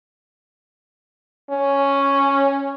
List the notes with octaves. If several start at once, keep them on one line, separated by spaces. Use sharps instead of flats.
C#4